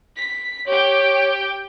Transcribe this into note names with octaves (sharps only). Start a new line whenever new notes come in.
B6
G4 C#5 G5